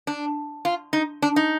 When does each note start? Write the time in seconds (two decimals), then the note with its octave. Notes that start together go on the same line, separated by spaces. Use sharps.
0.07 D4
0.65 F4
0.93 D#4
1.22 D4
1.36 D#4